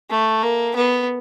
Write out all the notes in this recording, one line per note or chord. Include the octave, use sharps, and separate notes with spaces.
A3
A#3
B3